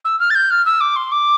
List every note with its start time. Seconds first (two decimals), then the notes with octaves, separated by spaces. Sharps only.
0.05 E6
0.20 F6
0.30 A6
0.35 G6
0.51 F6
0.66 E6
0.81 D6
0.96 C6
1.12 D6